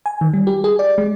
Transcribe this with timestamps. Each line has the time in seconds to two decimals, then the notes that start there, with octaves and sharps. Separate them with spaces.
0.06 G#5
0.21 D#3
0.34 G3
0.47 G4
0.64 G#4
0.79 D5
0.98 G#3